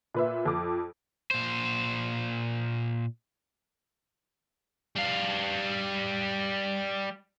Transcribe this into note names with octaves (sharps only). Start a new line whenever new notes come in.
A#2 B4 E5
F2 D6
A#2 C5
G3 F5